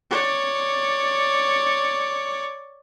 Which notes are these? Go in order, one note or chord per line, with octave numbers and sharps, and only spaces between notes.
C#5 D5